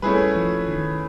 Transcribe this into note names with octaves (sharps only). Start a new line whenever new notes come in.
G3 A3 C#4 E4 G#4 B4
F3
D#3